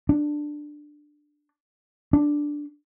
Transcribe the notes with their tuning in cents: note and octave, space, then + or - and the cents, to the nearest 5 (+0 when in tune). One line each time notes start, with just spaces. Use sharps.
D4 +10
D4 +0